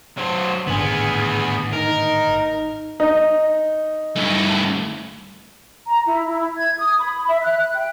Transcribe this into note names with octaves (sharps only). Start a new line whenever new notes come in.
F#3 C5
G#1 A2 D3 B3 G#4
D#4 A#4
D#4
G2 A3
A#5
E4
E4
G#6
D#6
B5
E5
F#6
G5